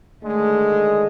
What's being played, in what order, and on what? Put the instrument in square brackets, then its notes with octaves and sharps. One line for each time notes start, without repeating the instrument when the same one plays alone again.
[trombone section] D3 D#3 G#3 [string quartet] A3